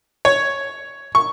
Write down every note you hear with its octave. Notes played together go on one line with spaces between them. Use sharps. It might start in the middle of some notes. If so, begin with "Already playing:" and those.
C#5
C#6